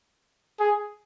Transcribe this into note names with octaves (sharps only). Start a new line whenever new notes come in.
G#4